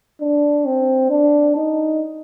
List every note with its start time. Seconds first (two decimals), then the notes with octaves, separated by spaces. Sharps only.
0.21 D4
0.66 C4
1.10 D4
1.56 D#4